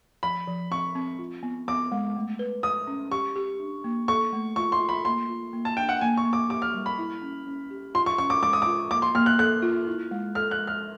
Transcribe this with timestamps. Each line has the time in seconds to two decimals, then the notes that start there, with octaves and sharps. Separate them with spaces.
0.23 F3 B5
0.47 F3
0.71 C4 C#6
0.95 C4
1.19 F4
1.43 B3
1.68 B3 D6
1.92 G#3
2.16 A3
2.39 B4
2.63 B4 D#6
2.87 C#4
3.11 G4 C#6
3.36 G4
3.60 D4
3.84 A#3
4.08 A4 C#6
4.33 A3
4.56 F4 C#6
4.72 C6
4.80 F4
4.89 B5
5.05 A#3 C6
5.29 F4
5.53 A#3
5.65 A5
5.77 D4 G5
5.89 F#5
6.01 A#3 G#5
6.17 C#6
6.25 A#3
6.33 D6
6.49 G4 D6
6.62 F6
6.74 G3
6.86 B5
6.98 E4
7.22 C#4
7.47 C#4
7.71 G4
7.95 F4 C6
8.06 C#6
8.18 C#4 C#6
8.30 D6
8.42 G#3 D6
8.53 D#6
8.62 D6
8.66 F4
8.90 A#3 D6
9.02 C6
9.15 A#3 F6
9.26 F#6
9.38 A4 F#6
9.62 F4
9.87 E4
10.11 G#3
10.35 A4 F6
10.51 F#6
10.59 G#3
10.67 F6